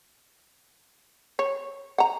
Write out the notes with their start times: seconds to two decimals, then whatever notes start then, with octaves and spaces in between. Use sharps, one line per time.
1.39 C#5
1.98 F#5 A#5